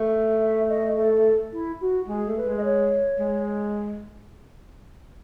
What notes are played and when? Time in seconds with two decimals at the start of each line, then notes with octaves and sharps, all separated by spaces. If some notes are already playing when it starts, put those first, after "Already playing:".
Already playing: A3
0.41 E5
0.69 D#5
0.96 A4
1.52 E4
1.81 F#4
2.08 G#3 G#4
2.27 A3
2.37 B4
2.46 G#3
2.57 D#5
2.64 C#5
3.19 G#3